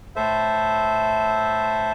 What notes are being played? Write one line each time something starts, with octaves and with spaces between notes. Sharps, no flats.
A2 A4 C5 E5